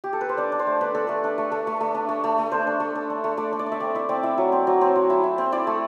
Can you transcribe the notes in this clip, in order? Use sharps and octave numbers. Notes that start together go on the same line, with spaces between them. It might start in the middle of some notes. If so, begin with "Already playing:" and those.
G4
A4
B4
C5
D4 D5
D4
C5
A3
D4 B4
D4 A4
A3 B4
D4
A3
A3
A3
A3
D4
A3
A3
A3
D4 C5
D4
A3
D4
D4
A3
A3 D5
D4
D5
D4
E5
C4 D5
E4 E5
C4 D5
E4 E5
F#3
C4
F#3
C4
F#3
E4
E4
C4
E4 D5
A3